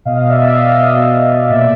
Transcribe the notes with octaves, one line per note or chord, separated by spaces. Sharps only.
B2 D#5 F5
B2
D5 E5
B2
D#5 F5
B2
E5
B2 D#5 F5
B2
B2
B2
F5
A#2 D5 E5